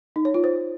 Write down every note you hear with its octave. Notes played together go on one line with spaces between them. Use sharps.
D#4
C#5
F4
C5